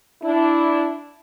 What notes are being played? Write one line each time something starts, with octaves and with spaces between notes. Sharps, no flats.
D4 E4